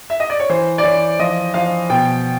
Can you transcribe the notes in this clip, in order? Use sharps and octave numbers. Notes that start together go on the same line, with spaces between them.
E5
D#5
D5
C#5
E3 C5
D5
E3 C#5
F3 D#5
F3 F5
B2 G5